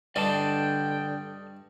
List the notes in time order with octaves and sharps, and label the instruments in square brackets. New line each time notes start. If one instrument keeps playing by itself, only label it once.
[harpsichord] G2 G3 [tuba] D3 [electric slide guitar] D5 D#5 A5 [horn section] G5